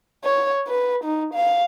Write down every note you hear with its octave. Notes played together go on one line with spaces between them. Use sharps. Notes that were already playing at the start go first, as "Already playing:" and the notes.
C#5
B4
D#4
F5